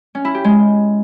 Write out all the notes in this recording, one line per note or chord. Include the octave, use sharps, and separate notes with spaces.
C#4
E4
G4
G#3